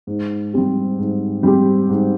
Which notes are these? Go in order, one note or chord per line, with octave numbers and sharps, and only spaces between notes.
G#2
G3 C4 G4
G#2
G3 C4 G4
G#2